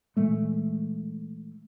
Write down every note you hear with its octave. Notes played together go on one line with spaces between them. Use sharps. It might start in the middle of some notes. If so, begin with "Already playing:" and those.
A#2 E3 G#3 A3